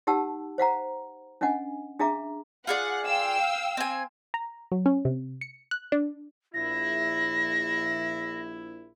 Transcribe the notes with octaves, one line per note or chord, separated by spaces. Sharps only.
D#4 G4 F#5 A5 E6
C5 F5 F#5 A#5
C#4 D4 D#5 F#5 G#5
D4 G#4 E5 F5 A#5 D6
F4 G#4 D5 F#5
F5 G5 E6
C4 G#5
A#5
F#3
C#4
C3
C#7
F#6
D4
A#1 E4 A#6